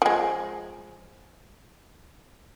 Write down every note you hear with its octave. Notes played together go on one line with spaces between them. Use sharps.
F3 G#3